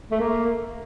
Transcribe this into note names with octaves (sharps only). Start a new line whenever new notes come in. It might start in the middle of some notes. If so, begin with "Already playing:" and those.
A3
A#3